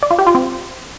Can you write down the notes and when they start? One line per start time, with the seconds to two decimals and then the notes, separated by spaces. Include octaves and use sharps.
0.03 D5
0.11 F4
0.19 G4
0.27 F4
0.35 C4